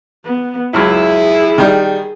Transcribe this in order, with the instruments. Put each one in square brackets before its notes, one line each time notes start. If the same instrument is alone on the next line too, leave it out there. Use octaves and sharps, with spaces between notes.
[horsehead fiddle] B3
[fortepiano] C#2 F#2 [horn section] E4 [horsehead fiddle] G#4
[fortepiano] D#3 G3